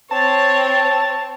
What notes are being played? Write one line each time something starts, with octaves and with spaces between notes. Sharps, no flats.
C4 C#5 A5